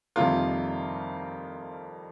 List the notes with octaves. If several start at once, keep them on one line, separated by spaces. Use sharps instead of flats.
F2 C3 D#3 G3 A#3 F4